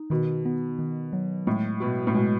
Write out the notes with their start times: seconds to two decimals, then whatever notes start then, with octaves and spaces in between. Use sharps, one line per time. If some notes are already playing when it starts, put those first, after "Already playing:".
Already playing: D#4
0.10 B2 D#3
0.45 B3
0.79 D#3
1.13 F#3
1.47 A2 G#3
1.80 B2 F#4
2.07 A2
2.15 B2 G#3